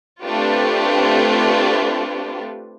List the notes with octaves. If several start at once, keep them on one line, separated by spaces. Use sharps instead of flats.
A3 C4 D4 F4 G4 B4